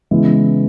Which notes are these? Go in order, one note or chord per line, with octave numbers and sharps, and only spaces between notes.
C#3 E3 G#3 B3 E4